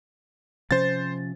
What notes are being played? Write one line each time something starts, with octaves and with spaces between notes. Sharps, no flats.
C3 F3 C#4 C5 A6